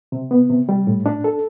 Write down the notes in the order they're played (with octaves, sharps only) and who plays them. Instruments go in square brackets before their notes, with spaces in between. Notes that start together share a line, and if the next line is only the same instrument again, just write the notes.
[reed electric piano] C3
B3
C3
G3
A2
D4
A4